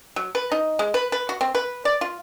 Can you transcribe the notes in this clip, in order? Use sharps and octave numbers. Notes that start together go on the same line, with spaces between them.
F#3
B4
D#4
G#3
B4
B4
F#4
C4
B4
D5
F4